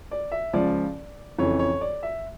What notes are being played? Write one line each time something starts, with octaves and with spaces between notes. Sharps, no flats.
D5
E5
C#2 C#3 F3 D5
F2 C#3 E3 C#5
C#5
D5
E5